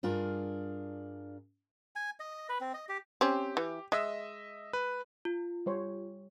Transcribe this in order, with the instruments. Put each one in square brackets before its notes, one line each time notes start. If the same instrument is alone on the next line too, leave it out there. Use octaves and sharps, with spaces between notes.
[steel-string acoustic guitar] G2 D4 F4 G#4 A#4
[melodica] G#5
D#5
B4
C4
D#5
G4
[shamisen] C4 C#4 [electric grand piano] G4
[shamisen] E3
[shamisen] G#3 [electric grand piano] D#5 E5 E6
[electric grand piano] B4
[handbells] F4
[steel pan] G3 C5 C#5